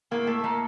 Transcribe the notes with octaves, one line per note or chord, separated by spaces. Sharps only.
A2 A#3
A3
A3 A#3